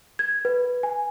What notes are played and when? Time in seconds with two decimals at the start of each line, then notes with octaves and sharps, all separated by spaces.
0.19 G#6
0.45 B4
0.83 G#5